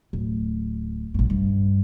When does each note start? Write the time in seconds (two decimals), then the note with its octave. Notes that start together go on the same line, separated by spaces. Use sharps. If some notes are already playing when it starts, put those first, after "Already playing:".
0.13 D1
1.14 A#1 G2
1.30 G2